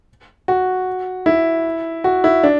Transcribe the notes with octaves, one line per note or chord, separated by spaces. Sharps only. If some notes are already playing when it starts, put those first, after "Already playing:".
F#4
E4
F#4
E4
D4